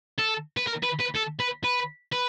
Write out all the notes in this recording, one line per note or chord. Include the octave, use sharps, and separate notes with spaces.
A4
B4
A#4
B4
B4
A4
B4
B4
B4